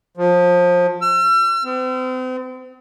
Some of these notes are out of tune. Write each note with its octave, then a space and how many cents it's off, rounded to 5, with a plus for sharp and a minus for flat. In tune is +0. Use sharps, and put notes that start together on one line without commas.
F3 +25
E6 +40
C4 -40